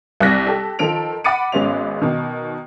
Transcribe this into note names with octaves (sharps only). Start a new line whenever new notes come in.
C2 C3 F#6 A#6 B6
G4 A4
D#3 F3 A4 D7 F7
F#5 B5 D6 A6 C#7 D#7
G#1 G#3 B3 C#4 E5 F7
B2 D#3